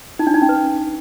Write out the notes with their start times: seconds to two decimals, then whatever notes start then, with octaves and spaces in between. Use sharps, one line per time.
0.19 D#4
0.27 D4
0.34 D#4
0.42 C#4
0.49 B4